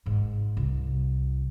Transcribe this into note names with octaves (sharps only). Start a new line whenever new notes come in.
G#1 G#2
C2